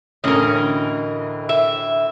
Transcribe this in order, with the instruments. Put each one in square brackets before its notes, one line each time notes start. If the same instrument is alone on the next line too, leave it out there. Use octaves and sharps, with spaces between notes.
[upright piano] D2 A2 [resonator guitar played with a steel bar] E3 C#4 [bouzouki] A#4 D#5
[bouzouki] E5